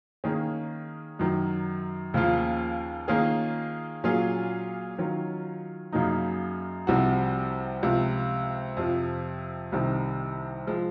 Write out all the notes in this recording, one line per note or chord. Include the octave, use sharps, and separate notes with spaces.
D#3 A#3 C#4 G#4
F#2 D#3 F#3
D#2 C#3 F3 A#3 F4
D#3 A#3 C#4 F4 G#4
A#2 F#3 C#4 F4 G#4
D#3 F#3 C#4 F4
F#2 C#3 F#3 A#3 D#4
C2 C3 F3 C4 F#4
C#2 C3 F3
F2 C3 F3
C2 C3 D#3
F3 G#3